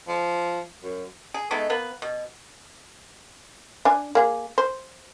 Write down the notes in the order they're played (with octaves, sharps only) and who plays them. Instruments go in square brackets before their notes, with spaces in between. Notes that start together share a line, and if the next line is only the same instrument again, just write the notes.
[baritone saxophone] F3
F#2
[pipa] G#4
G#3 A3 B3 D#4
A#3 B3 B4
B2
[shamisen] D4 G#5
A#3 G#4
C5